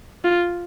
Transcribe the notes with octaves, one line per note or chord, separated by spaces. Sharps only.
F4